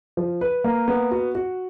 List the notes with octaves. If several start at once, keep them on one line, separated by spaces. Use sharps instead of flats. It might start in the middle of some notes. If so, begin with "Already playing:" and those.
F3
B4
A#3
B3
F#4
F#4